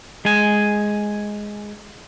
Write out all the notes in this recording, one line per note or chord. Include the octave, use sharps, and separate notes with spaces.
G#3 G#5